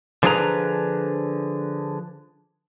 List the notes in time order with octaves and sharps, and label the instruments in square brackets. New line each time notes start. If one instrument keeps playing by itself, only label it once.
[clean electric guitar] D3 F3 D4 G#4 B4 A#5